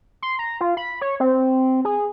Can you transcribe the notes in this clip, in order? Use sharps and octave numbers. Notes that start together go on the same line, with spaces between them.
C6
A#5
F4
B5
C#5
C4
G#4